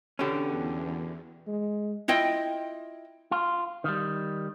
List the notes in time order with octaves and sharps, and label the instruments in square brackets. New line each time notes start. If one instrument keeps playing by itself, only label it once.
[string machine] E2 [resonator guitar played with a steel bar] B2 D3 [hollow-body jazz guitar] C#4 G4
[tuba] G#3
[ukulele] E4 F4 D#5 G5
[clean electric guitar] F4
D#3 G3